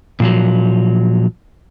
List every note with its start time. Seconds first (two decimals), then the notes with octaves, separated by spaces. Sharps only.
0.20 A#2 F3 F#3